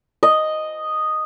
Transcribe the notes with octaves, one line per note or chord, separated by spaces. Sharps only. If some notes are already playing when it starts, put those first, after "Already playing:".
D#5